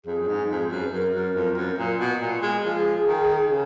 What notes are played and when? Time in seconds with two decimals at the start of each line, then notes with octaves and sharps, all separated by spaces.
0.06 F2 G#4
0.19 F#2
0.28 G#2
0.50 F2
0.70 F#2
0.85 B4
0.92 F#2 A#4
1.14 F#2
1.35 F2
1.57 F#2
1.78 A#2
2.00 B2
2.21 A#2
2.42 G#3
2.65 F3 G#4
3.08 D#3
3.50 C#3